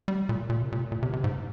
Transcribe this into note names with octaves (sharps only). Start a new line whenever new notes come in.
G3
A#2
A#2
C3
A#2
A#2
C3
C3
G#2